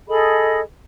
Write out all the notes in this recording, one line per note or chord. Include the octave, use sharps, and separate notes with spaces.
G#4 A4 D#5 B5